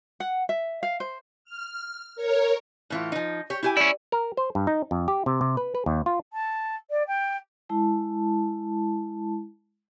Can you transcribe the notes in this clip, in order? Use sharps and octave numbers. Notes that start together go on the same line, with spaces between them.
F#5
E5
F5
C5
F6
A#4 C#5
A2 E3 F4
F3 D#4
G4 C#5
E4 G4 G#5
C#4 E4 D5
A#4
C5
G2
D#4
F2
G4
C3
C3
B4
B4
D#2
F4
A5
D5
G5
G#3 E4 A5